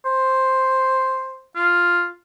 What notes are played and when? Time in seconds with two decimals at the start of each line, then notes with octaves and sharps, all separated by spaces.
0.05 C5
1.56 F4